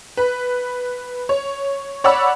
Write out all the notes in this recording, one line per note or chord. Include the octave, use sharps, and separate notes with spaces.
B4
C#5
C#5 D5 F#5 B5 E6